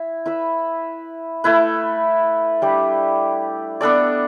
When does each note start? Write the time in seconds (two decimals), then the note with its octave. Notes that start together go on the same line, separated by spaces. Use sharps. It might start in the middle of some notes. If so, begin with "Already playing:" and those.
Already playing: E4
0.26 E4 B4 E5
1.44 A3 E4 B4
2.62 G3 D4 G4 B4
3.81 B3 D4 A4 D5